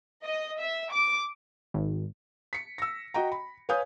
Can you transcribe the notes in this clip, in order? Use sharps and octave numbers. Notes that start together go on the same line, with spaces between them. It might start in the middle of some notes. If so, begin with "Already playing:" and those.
D#5
E5
D6
G#1
B6 C#7
E6 A#6
F#4 D#5 G5 A#5
B5
B4 C#5 F5 G#5 D#6 G6